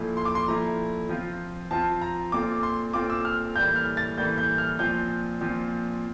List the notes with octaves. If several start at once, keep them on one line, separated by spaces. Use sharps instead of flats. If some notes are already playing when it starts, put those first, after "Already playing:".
Already playing: A#2 F3 A3 E4
C6
D6
C6
A#2 F3 A3 E4 A#5
F3 C4 F4
F3 C4 F4 A5
A#5
A#2 A3 C4 F4 D6
C6
A#2 A3 C4 F4 D6
E6
F6
A2 E3 G3 A#3 G6
F6
A6
A2 E3 G3 A#3 G6
G6
F6
A#2 F3 C4 G6
A#2 F3 C4